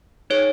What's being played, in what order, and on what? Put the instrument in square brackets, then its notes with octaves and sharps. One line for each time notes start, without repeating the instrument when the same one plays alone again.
[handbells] D#4 G#4 C#5